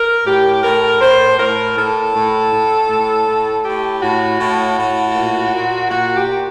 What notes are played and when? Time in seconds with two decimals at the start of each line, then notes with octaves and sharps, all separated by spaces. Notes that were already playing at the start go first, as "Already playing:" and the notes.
Already playing: A#4
0.26 A2 G4
0.63 A2 A#4
1.01 A2 C5
1.38 A2 A#4
1.76 A2 A4
2.15 A2
2.52 A2
2.89 A2
3.26 A2
3.64 A2 G4
4.01 A2 F#4
4.39 A2
4.77 A2
5.14 A#2
5.53 A#2
5.90 A#2 F#4
6.15 G4
6.27 A#2